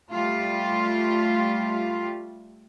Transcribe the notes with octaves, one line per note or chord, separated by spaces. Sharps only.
G3 A3 F4